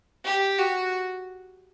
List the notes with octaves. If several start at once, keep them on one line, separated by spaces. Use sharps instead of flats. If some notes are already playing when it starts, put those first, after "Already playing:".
G4
F#4